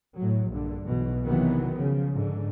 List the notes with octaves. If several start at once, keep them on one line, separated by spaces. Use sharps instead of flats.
A2 F#3
A#1 G2 D3
B1 B2 E3
C3 D#3 E3 F#3 B3
C#3 F3
G#2 D3